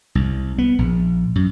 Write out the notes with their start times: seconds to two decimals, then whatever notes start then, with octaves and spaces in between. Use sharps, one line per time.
0.15 C2
0.58 B3
0.79 A#1
1.36 F#2